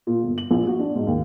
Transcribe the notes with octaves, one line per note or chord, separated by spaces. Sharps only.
A#2
G1
F#7
A#1
F#4
D4
G#2
D#2